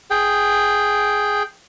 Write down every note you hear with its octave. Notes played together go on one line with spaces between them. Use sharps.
G#4 G5